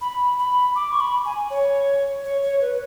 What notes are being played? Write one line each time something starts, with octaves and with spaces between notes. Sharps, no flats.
B5
B5
D6
C#6
B5
G#5
C#5
C#5
C#5
B4